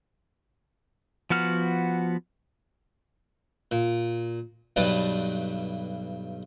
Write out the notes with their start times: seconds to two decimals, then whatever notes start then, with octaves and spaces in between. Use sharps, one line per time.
1.30 F3 B3 F#4 F6
3.71 A#2
4.76 B1 G2 G3 B4 A5